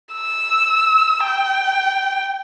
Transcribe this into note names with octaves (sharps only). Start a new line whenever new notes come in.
E6
G5